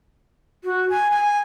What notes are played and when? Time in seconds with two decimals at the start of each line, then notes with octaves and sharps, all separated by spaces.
0.64 F#4
0.90 G#5
1.11 G#5